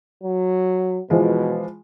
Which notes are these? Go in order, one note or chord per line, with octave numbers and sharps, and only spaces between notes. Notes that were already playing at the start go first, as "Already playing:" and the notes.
F#3
B2 E3 F3 G#3